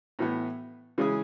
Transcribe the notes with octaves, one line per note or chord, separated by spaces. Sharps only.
A2 E3 B3
C#3 E3 G#3 C#4 G#4